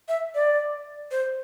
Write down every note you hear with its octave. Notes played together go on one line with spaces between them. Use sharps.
E5
D5
C5